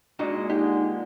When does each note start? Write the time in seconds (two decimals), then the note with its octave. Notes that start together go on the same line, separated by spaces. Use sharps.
0.19 A#2 G#3 D4 D#4 F#4
0.50 D3 D#4 G4